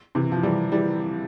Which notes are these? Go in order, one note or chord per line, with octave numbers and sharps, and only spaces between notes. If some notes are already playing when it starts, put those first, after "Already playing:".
C3 E3
F3
E3 G3
E3 G3